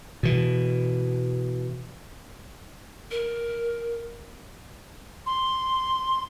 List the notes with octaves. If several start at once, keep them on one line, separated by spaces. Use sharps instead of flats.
B2 E3
A#4
C6